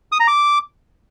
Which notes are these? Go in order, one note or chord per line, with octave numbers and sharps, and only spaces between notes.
D#6
A#5
D6